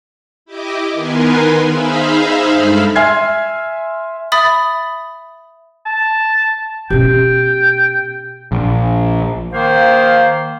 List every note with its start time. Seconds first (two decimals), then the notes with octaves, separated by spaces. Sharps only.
0.46 E4 G4 D#5 D6
0.92 D#3 B3 A#4 B4 G#5 C6
1.64 D#4 G#4 C5 E5 F5 B5
2.51 G2 G#3 A4 B5 F6
2.96 E5 G#5 C6 F6 G#6 C7
4.32 E5 B5 D#6 A6
5.86 A5
6.90 B2 C#4 G4 G5
8.52 A#1
9.52 D#3 A#3 C5 F5